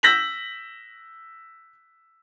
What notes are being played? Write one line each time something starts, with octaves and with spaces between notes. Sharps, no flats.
E6 G6 A#6 B6 F#7